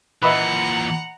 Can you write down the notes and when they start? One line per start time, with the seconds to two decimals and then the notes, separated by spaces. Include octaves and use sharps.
0.22 A#2 E3 B4 D#5 E5 F#5 A#5